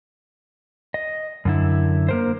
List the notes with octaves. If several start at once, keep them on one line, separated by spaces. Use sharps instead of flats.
D#5
F#2 D3 E4
A#3 A#4 C5